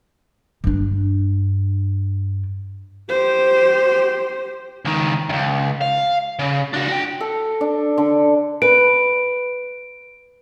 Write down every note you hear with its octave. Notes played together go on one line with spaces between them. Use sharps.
G2 D4
G4 C5
C#2 D#3
C#2 F#2
F5
C#3
D4 F#4
F#4 G5
A4
D4
D3
B4 D7